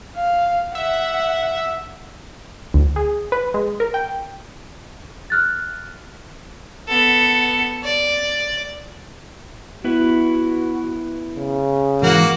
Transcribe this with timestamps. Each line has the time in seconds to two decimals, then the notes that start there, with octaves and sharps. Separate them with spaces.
0.15 F5
0.75 E5 F#5
2.74 D2
2.96 G#4
3.32 B4
3.54 G#3
3.80 A#4
3.94 G5
5.30 F6 F#6 A6
6.89 B3 A4
7.84 D5
9.84 B3 E4 F#4 B4
11.36 C#3
12.02 G#2 E3 A#3 F#4 F#5